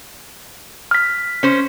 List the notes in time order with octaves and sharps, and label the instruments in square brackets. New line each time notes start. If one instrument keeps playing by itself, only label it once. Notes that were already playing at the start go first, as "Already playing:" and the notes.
[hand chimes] F6 B6
[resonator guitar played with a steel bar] C#4 C5